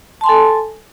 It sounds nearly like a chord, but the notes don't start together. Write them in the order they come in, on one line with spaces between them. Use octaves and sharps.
A5 C6 G#5 A4